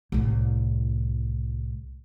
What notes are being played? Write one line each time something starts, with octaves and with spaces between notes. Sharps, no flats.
C2 A2